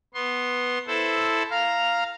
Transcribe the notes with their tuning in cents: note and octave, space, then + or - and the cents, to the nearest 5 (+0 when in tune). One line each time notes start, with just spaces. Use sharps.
B3 +0 C6 +15
E4 +0 A4 +0 C5 +0
F5 +0 A#5 +0